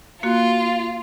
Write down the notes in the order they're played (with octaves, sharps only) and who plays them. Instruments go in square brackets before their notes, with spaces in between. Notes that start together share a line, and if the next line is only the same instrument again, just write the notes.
[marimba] A#3 F#4 [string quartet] F4